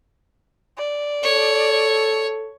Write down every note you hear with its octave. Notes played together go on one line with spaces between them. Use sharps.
D5
A4 C#5